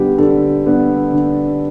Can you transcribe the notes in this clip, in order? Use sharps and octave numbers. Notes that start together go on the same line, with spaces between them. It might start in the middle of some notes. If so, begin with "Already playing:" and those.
Already playing: D3 G3 B3 D4 G4
D3 A4
G3 B3 D4
D3